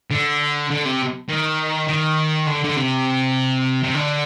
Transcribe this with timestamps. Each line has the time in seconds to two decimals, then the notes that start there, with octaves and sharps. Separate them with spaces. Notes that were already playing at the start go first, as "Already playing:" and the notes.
0.11 D3
0.70 D3
0.85 C3
1.29 D#3
1.88 D#3
2.47 D3
2.64 D3
2.77 C3
3.83 C3
3.95 D3